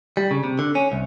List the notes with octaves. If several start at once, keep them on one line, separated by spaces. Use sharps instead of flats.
G3
C#3
C3
D3
C#4
C2